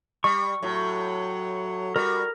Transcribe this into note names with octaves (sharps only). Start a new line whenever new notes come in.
G3 C#6
A2 F#3
G3 F#4 A#4